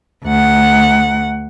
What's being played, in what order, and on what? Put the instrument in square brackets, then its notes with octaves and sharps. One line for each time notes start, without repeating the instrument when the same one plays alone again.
[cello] D2 F#5